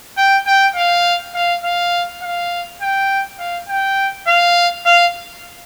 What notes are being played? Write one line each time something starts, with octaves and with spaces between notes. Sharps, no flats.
G5
G5
F5
F5
F5
F5
G5
F5
G5
F5
F5